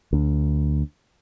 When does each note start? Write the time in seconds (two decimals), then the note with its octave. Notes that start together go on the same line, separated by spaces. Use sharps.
0.13 D2 D4